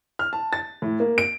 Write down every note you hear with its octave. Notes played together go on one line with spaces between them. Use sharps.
F6
A5
A6
A2
A#3
D7